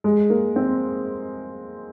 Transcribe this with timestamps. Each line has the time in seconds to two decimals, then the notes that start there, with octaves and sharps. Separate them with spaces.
0.04 G#3
0.30 A#3
0.56 C4